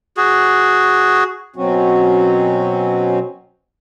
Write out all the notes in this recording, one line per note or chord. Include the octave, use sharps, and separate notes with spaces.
F#4 G#4
B2 F#3 C4 C#4 F#4